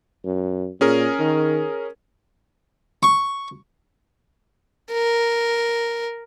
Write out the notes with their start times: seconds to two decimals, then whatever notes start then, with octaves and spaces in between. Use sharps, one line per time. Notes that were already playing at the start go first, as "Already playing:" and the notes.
0.25 F#2
0.81 A#2 C#4 G#4 A#4
1.19 D#3
3.03 C#6
4.92 A#4